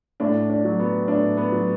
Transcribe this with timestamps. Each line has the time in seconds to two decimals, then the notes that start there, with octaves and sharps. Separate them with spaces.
0.20 A2 D4
0.50 D4
0.64 F#3
0.79 B3
1.08 A2 D4
1.37 B3
1.52 F#3